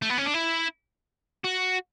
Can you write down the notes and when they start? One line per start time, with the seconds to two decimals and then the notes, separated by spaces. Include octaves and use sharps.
0.02 A3
0.10 B3
0.18 C#4
0.26 D4
0.34 E4
1.44 F#4